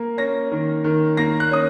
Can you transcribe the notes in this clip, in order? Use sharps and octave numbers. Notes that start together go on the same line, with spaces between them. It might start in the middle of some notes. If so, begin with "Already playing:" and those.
Already playing: A#3
C#4 A#6
D#3
D#3
A#3 A#6
F#6
C#4 D#6